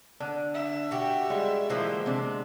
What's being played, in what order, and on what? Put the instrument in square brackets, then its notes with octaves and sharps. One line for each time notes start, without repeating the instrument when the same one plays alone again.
[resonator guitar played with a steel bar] D3 [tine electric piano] D4
[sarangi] E5
[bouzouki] F#4 G4
[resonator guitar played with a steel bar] G3 [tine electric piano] G#3
[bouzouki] D3 A#3 C5 [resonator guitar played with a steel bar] E3 F3
[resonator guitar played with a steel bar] C3 D4